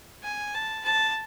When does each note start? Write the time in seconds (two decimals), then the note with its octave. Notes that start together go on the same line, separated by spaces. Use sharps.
0.23 G#5
0.54 A5
0.85 A5